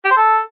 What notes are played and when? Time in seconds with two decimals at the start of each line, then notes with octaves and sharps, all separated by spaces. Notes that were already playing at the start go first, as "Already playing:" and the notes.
0.05 G4
0.11 C5
0.17 A4